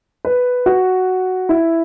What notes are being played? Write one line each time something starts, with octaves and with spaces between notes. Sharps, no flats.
B4
F#4
E4